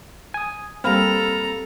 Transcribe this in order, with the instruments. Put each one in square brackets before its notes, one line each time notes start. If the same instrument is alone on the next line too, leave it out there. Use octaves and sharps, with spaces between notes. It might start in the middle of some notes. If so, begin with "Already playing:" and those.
[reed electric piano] G#5 D#6
[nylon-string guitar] G3 A#3 [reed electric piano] C4 [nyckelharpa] A4 A#5 [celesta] F5 B5 F6